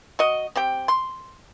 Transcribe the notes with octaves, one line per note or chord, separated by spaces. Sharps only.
F#4 D#5
C4 G4 G5
C6